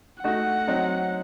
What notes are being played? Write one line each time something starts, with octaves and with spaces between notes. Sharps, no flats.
A3 D#4 F#4 F#5
F#3 C4 D#4